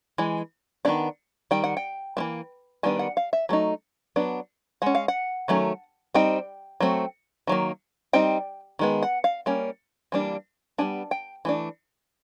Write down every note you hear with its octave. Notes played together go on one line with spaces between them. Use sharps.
E3 G#3
D#3 F#3 B3 D4
D#3 G3 G5
F#5
G5
E3 G3 A#3
D#3 G3 B3 D4 G#5
F#5
F5
E5
F#3 A3 D#4
F#3 B3 D4
G#3 C#4 F#5
F5
F#5
D#3 F#3 A3 C#4
G3 C4 D#4 G5
F#3 A3 C4
D#3 F#3 A#3
G3 C4 D#4 G5
D#3 G#3 B3
F#5
F5
G3 A#3 C#4
E3 G3 A#3 D4
G3 B3 D4 G#5
G5
E3 A3 D4